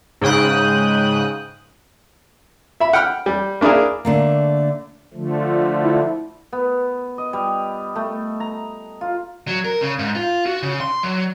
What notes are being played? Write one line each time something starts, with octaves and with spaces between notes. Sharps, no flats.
G#2 C#3 G5 D#6 F#6
E5 B5
F#5 G5 B5 F6
G3
A#3 D4 E4 G#4 A#4
D3 A3 A#3
D3 F3 A3
E4
B3
D#5
G3
A3
A#5
F4
F#3
A#4
C#3
G#2
F4
F#4
C#3
C6
F#3